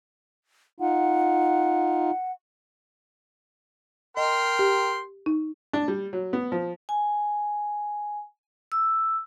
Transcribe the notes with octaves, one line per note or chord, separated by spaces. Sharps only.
D#4 F4 F#5
A#4 D#5 G5 C6
G4
D#4
D4
G3
F#3
B3
F3
G#5
E6